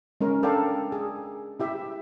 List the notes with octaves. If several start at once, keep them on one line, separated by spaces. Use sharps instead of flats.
G#3 C#4 A#4
D4 A4 A#4 D5 F5 G5
G#4
E4 G4 E5